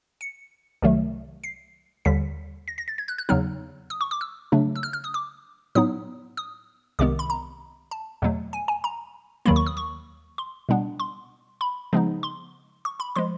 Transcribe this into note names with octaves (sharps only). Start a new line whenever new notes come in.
C#7
C2 C3 D#3 F#3 A3
C7
D#2 D3 G3 B6
A#6
A#6
A6
G#6
F#6
F#6
E2 C#3 F#3 B3 D#4 F6
D#6
C#6
D6
E6
C#3 F#3 A3 D4
E6
F6
F6
D#6
D6
A2 F#3 B3 D#4 D#6
D#6
C2 C3 D#3 G#3 B3 D6
B5
A#5
A5
E2 B2 F#3 A3
G#5
G#5
A#5
D#2 D#3 F#3 A#3 B5
C#6
D#6
C#6
C6
B2 G3 B3 D4
C6
B5
C#3 F3 G#3 B3 D#4
C6
C#6
B5
F3 G#3 C6